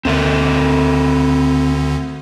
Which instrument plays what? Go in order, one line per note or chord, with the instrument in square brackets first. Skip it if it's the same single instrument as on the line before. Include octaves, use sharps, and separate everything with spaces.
[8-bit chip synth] D2 D3 [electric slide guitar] C4 A4 A#4